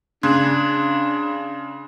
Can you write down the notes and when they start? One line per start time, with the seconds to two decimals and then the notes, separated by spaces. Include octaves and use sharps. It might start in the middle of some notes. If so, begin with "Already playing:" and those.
0.23 C#3 D4 C6 F#6 G#6